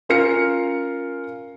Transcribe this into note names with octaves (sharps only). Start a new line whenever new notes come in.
C#4 F4 A#4 F6 C7 C#7